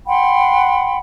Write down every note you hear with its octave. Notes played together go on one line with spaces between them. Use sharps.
F#5 G5 B5 C6